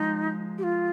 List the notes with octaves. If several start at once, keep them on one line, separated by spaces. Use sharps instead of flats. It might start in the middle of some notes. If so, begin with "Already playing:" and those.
Already playing: F3 G#3 D#4
G4
F4